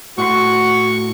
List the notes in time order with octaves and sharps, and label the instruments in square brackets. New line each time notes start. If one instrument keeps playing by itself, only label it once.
[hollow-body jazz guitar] A2 F#5 C6 [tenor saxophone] F#4 [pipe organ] C#6